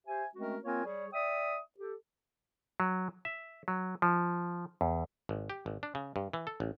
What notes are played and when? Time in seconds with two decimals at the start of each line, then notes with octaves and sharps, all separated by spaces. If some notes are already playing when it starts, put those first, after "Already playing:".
0.06 G4 C5 E5 G#5
0.35 G#3 A3 C4 C#4 F#4 A#4
0.64 A#3 C4 F4 A#4 C#5 G#5
0.84 G3 G#4 C#5
1.13 D5 E5 G5 D#6
1.79 G4 A4
2.80 F#3
3.25 E5
3.68 F#3
4.02 F3
4.81 E2
5.29 G#1
5.50 G4
5.66 G#1
5.83 D4
5.95 C#3
6.16 G2
6.33 E3
6.47 A4
6.60 A1